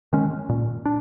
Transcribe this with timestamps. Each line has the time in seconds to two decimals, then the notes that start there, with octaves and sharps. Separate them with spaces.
0.13 D#3 G#3 C#4
0.49 A#2
0.86 D4